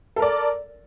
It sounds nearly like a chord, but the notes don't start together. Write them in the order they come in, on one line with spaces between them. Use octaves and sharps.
A4 A#4 D5